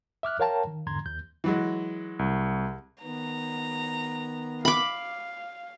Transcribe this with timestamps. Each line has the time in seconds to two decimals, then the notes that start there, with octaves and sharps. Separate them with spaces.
0.23 E5 D6 F6 F#6
0.40 A#4 C#5 F5 G5 A5 A#5
0.67 D#3
0.87 E2 G#2 D3 A#5 C6 G#6
1.06 D#2 G6
1.44 E3 F#3 G#3
2.19 C2
3.03 D#3 B3 A#5
4.65 F5 B5 D6